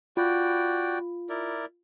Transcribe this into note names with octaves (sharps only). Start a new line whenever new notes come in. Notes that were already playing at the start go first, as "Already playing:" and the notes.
F4 F#4 D5 G5
E4 A#4 D5